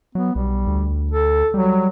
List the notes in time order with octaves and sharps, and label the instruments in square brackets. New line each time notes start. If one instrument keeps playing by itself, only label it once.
[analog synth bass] F#3 [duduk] B3
[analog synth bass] B1 [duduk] G3
[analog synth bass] D2
[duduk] A4
[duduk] F#3 [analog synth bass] G3